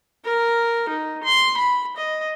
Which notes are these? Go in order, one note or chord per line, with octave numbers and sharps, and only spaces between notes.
A#4
D#4
C6
B5
D#5